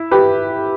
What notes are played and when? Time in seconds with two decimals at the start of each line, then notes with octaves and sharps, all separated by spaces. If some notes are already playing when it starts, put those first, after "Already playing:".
Already playing: E4
0.11 G4 B4